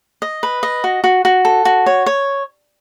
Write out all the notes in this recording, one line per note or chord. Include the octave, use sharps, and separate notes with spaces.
D#5
B4
D#5
F#4
F#4
F#4
A4
F#4
C#5
C#5